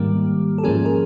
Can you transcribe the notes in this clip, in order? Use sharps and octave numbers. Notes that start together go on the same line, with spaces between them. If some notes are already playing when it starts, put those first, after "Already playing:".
Already playing: G#2 D#3 G3 A#3 G4
A4
G#2 F3 A#3 C#4 G#4 A#4
G#4 A#4